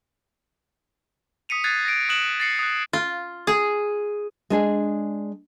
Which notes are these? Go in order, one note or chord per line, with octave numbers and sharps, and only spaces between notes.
D#6 B6 C#7 D#7 F7
F#6 G#6 A6 C7 D#7
A#6 D7
D#6 F#6 E7 F#7
A6 A#6 C7 C#7 F#7
D#6 F#6
F4
G#4
G#3 D4 G#4